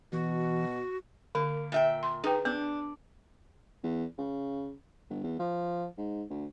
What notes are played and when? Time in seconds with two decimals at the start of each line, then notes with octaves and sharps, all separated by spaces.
0.12 B2 E3 F#4
1.35 D3 A#3
1.72 A#2 E5 G5
2.03 C6
2.24 D#4 G#4 B4 G5
2.45 B3 D4
3.83 E2
4.18 C#3
5.10 G1
5.24 E2
5.39 F3
5.97 G#2
6.30 D2